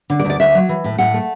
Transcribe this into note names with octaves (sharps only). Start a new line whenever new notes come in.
D3
D5
D2
D5
D2 E5
F#3
E3
A2
A2 F#5
A3